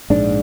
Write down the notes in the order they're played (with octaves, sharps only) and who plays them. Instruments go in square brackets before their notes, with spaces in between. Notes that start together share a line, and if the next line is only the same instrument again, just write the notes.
[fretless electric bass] A#1 G#2 D4